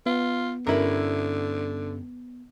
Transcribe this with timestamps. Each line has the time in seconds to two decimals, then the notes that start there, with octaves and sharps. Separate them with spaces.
0.06 B3 F4
0.67 G2 D3 C#4 E4 A#4 D5